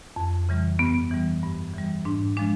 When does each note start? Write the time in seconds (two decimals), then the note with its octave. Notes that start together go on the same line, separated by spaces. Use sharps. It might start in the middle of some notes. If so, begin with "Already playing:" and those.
0.16 F2
0.49 C#3 E3 G3
0.79 G2 B3
1.11 E3 G3
1.43 G2
1.74 E3 G3
2.05 G#2 D4
2.37 F3 G#3 D4